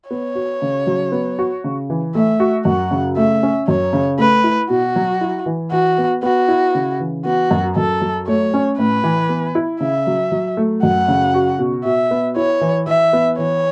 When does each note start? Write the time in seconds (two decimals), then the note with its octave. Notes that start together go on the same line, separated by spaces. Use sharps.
0.10 B3 C#5
0.35 F#4
0.62 C#3
0.87 F#3
1.12 B3
1.39 F#4
1.64 C#3
1.90 E3
2.15 A3 E5
2.40 F#4
2.65 F#2 F#5
2.91 C#3
3.17 A3 E5
3.43 C#4
3.68 F#2 C#5
3.93 C#3
4.18 A3 B4
4.44 E4
4.70 B2 F#4
4.96 F#3
5.21 E4
5.46 E3
5.72 E3 F#4
5.98 B3
6.23 B3 F#4
6.48 E4
6.75 C#3
7.00 E3
7.25 B3 F#4
7.51 F#2
7.76 F#2 A4
8.01 F#3
8.27 A3 C#5
8.54 C#4
8.78 A2 B4
9.04 E3
9.29 B3
9.55 E4
9.80 C#3 E5
10.07 F#3
10.32 F#3
10.57 A3
10.83 F#2 F#5
11.08 C#3
11.34 F#4
11.59 B2
11.85 B2 E5
12.11 B3
12.36 E4 C#5
12.61 E3
12.87 E3 E5
13.13 B3
13.38 E3 C#5